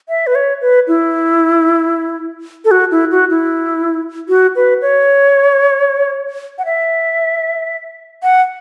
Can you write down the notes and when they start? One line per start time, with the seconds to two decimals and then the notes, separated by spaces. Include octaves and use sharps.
0.09 E5
0.27 B4
0.35 C#5
0.61 B4
0.88 E4
2.65 A4
2.71 F#4
2.91 E4
3.11 F#4
3.30 E4
4.29 F#4
4.56 B4
4.82 C#5
6.58 F#5
6.65 E5
8.23 F#5